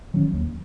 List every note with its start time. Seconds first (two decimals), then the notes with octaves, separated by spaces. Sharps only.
0.14 D#3 F#3 C#4
0.33 D#2